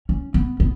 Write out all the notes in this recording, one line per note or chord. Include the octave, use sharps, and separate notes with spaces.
C#4
B3
B3